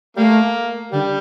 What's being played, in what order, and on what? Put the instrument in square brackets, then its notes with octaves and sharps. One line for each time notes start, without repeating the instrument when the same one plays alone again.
[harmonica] G3 A#3 [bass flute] A3
[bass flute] D3 [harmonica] G3